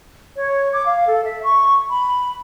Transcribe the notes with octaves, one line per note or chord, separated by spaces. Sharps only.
C#5
D6
F5
A4
E5
C#6
B5